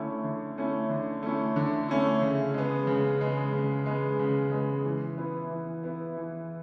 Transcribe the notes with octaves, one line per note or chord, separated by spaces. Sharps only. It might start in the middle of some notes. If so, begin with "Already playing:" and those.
Already playing: D3 A3 C#4 E4
D3
A3 C#4 E4
D3
A3 C#4 E4
D3
A3 C#4 E4
C#3
G#3 B3
C#3
G#3 B3
C#3
G#3 B3
C#3
G#3 B3
E3
B3 E4
E3
B3 E4
E3